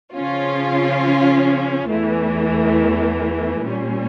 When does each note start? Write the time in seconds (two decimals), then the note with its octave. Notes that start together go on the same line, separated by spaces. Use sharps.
0.14 C#3 F3 C#4 F4
1.88 E2 E3 A3
3.62 A#2 G3 C#4